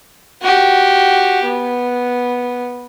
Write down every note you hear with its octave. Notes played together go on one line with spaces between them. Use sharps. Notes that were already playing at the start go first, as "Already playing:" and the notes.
F#4 G4
B3